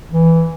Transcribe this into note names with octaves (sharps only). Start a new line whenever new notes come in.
E3